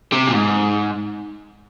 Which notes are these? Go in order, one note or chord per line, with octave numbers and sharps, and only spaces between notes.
C3
A#2
G#2